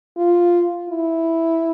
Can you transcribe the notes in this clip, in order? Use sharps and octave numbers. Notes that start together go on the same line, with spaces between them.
F4
E4